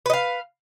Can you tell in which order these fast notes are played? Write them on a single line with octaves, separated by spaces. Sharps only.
B4 D#5 F5